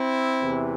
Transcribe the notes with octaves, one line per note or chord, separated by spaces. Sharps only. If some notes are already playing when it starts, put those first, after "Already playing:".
Already playing: C4 E4
E2 C3 E3